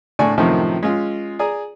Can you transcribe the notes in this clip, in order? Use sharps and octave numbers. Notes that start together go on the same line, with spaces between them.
A2 D3 D5 G#5 C#6
F#2 A2 C3 D#3 F3
G#3 C#4 F4
G#4 D5 A#5 D#6